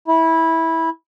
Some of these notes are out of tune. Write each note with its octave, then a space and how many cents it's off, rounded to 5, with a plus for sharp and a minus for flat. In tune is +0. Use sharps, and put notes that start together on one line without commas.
E4 -15